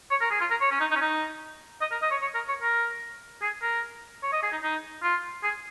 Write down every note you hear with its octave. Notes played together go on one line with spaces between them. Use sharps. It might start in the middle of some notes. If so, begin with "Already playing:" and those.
C#5
A#4
G#4
F4
A#4
C#5
C#4
D#4
D#4
C#4
D#4
D#5
A#4
D#5
C#5
C#5
A#4
C#5
A#4
G#4
A#4
C#5
D#5
G#4
D#4
D#4
F4
G#4